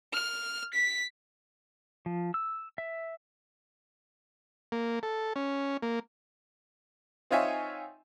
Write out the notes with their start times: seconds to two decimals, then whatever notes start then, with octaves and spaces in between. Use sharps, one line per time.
0.13 F6
0.74 B6
2.06 F3
2.34 E6
2.78 E5
4.72 A#3
5.03 A4
5.36 C#4
5.82 A#3
7.31 C4 D#4 F4 C#5 E5 G#5